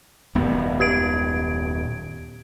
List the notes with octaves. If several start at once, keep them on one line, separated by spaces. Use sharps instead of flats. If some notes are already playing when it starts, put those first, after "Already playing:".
D#1 F#2 B3
G4 G#6 D7